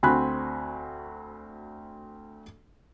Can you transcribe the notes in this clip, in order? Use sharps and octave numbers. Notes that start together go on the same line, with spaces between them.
D2 C4 F#4 G#5 B5 F#6